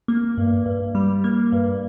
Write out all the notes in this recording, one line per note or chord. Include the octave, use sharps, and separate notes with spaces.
A#3
G2
G2
G3
A#3
G2